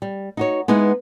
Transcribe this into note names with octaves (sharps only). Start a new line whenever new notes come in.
G3
D#4 F#4 C#5
G#3 B3 D#4 E4 G#4